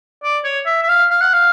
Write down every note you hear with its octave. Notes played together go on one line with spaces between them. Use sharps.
D5
C#5
E5
E5
F5
F5
F#5
F5